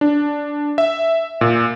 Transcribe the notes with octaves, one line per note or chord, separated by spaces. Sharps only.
D4
E5
A#2